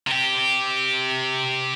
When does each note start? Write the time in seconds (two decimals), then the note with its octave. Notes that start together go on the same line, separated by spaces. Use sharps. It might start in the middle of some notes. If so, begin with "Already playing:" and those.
0.07 C3 G4